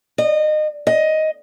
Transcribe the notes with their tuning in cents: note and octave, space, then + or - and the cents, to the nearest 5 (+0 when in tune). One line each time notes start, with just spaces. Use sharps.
D#5 -25
D#5 +10